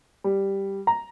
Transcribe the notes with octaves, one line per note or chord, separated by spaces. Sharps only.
G3
A#5